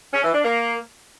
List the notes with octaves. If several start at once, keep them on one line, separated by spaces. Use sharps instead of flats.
C#4
E3
D4
A#3